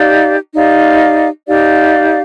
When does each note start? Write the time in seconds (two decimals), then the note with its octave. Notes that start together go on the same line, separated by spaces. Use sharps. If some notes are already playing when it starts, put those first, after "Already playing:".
Already playing: D#4 G4 D5 F5
0.55 D#4 G4 D5 F5
1.47 D#4 G4 D5 F5